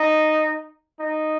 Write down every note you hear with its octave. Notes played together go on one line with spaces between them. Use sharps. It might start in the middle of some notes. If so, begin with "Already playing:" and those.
Already playing: D#4
D#4